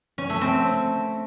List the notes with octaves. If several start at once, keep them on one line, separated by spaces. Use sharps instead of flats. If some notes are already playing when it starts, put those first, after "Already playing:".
C#4
A3
C4